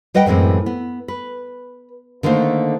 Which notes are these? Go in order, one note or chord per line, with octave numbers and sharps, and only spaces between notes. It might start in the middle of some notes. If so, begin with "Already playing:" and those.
G3 B4 D#5 F#5 G5
F#2 A2 E3 G#3 C4
B3
B4
D3 D#3 A3 A#3 C5